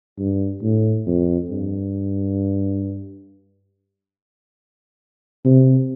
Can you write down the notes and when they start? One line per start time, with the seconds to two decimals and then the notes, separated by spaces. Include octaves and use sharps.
0.18 G2
0.63 A2
1.07 F2
1.50 G2
5.45 C3